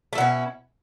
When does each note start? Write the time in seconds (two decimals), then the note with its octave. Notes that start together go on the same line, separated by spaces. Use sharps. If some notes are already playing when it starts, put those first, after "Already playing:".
0.13 A3
0.15 E4
0.18 B2
0.20 C#4